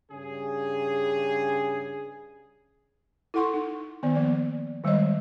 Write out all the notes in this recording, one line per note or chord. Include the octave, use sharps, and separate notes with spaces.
G2 C#3 G#4
E4 A4 F#5 C6 C#6
D#4
D#3 B3 D5
F3 A#3 D5
D#3 G3 G#3 C#5 D#5